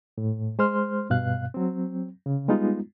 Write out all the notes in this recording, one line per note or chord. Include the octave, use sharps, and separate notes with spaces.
A2
G#3 C5 C6 F6
G2 B2 F5 F#6
F#3 C4
C#3
G3 G#3 B3 D#4 F4